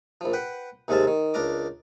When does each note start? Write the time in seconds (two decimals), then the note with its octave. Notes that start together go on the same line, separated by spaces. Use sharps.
0.21 A#1 F3
0.33 B4 F#5 G5
0.88 D#2 C3 G#3 C4 F5 A5
1.07 D#3
1.34 C#2 D4 A#4 A#5 D6